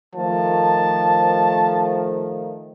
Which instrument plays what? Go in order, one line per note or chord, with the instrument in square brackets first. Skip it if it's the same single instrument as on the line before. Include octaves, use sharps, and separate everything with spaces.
[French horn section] D#3 F3 A3 [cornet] A5